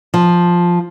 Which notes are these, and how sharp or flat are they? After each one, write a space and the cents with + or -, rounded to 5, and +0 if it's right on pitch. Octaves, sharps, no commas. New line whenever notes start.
F3 +5